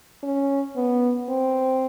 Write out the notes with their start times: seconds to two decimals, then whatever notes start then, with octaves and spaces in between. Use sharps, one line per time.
0.23 C#4
0.76 B3
1.29 C4